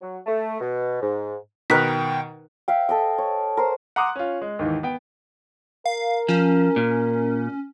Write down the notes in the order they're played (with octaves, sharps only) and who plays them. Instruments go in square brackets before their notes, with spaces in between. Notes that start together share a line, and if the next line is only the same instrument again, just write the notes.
[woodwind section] F#3
A3
B2
G#2
[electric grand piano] B2 D#3 [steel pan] D#4 A#4 B4 [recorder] G5 [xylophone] F#6 B6
[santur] E5 F5 G5
A4 D#5 G5
C#5
A#4 C5 C6
[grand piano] F#5 A#5 C6 D6 D#6 F#6
C#4 F4
G#3
D#2 G#2 D#3 E3
B3 G5
[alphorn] A#4 [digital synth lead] F5
[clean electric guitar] F3 [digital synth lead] C#4
[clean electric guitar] A#2